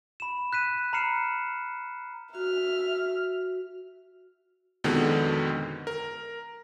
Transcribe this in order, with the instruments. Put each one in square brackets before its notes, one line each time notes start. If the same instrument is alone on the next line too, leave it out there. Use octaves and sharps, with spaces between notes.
[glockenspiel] B5 E7
F#6 B6 D#7
A#5 B5 F6 C7 C#7 E7
[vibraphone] F#4 [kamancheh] E5 F6
[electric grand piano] F2 B2 D3 D#3 G#3 B3
A#4